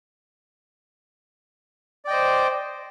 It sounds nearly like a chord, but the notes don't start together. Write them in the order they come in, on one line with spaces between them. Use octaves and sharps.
D5 G5 D#5 C5